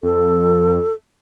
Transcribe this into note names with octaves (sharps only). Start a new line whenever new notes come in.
F2 A4